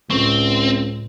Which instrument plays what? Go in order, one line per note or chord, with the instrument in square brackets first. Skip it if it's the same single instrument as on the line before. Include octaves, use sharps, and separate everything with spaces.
[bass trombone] C#2 [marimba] A2 [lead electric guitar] C4